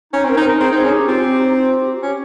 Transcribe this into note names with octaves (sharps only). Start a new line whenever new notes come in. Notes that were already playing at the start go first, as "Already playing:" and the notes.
C#4 D#4
C4
A#4
D#4
A#4
C4 G#4
D#4
G#4
C#4
G4
C4 F4
G4
D#4
D#4
F4
G4
G4
F4
C#4 G4